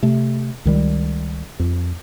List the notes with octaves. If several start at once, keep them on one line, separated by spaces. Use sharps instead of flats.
C3 A3
C#2 D#3 G3
F2